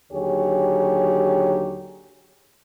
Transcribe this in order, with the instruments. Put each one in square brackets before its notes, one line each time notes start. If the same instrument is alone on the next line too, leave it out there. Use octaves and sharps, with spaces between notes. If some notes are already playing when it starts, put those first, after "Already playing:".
[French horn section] D#2 D3 F#3 G4 G#4 C#5